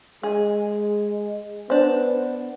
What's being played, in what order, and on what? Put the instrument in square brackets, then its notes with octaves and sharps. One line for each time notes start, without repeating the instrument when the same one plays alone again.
[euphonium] G#3 [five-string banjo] G#4
[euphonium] B3 [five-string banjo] D4 C5